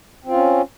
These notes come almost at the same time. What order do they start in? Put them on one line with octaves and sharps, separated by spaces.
C4 F4 C#4